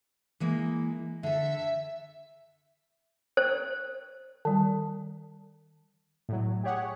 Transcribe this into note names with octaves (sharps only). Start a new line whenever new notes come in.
E3 G#3 A#3
D3 A4 E5
C5
D#3 G3
A2 F#3
G4 G#4 C#5 F#5